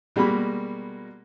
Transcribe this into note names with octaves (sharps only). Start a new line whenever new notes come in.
B2 G3 G#3 A#3 B5